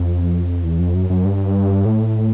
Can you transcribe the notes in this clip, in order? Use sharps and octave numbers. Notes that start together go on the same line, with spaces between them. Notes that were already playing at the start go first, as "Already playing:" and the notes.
Already playing: F2
E2
F2
F#2
F#2
G2
A2